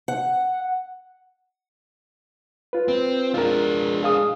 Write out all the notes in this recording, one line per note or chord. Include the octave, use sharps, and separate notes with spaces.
F#5
F4 B4
C4
G#3 D4 F4 A#4
G#4 F5 D#6